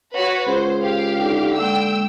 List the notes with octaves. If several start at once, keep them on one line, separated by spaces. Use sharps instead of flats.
F#4 B4 C#5
C#2 G#4 C5
G4 F5
D3 D#4 D6
G#3 A#3 G5 D6 E6